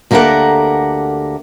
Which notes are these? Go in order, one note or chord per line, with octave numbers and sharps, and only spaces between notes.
D2 A#3 G4 A4 A#4 F#5